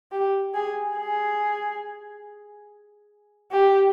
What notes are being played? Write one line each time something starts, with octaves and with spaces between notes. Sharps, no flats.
G4
G#4
G#4
G4